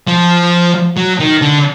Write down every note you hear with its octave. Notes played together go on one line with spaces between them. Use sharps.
F3
F#3
D#3
D3